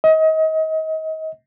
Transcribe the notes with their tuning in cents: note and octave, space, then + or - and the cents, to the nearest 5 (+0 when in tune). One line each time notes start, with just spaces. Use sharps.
D#5 +30